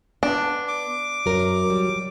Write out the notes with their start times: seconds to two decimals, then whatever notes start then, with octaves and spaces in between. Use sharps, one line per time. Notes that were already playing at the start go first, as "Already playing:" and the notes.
0.23 B3 D4
0.68 D6
1.26 F#2 F#3 A#4
1.70 G3